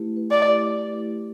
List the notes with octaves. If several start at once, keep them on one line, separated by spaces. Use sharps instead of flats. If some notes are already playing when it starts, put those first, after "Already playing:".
Already playing: A3 E4 G4 B4
B4
D5
G4